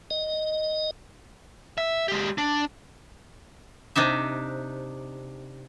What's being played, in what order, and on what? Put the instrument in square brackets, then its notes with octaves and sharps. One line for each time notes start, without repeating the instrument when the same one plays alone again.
[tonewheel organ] D#5
[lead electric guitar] E5
G#3 G4
D4
[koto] C3 D4 D#4 E5